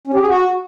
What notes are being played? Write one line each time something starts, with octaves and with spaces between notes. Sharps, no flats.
C#4
G4
G#4
F#4